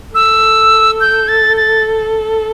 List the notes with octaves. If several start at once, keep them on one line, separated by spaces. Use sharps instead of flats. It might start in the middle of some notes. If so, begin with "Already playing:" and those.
A4 E6
G6
A6
A6